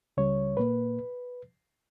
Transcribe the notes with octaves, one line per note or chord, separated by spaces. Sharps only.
C#2 C#3 G3 C#5
A#2 A#3 B4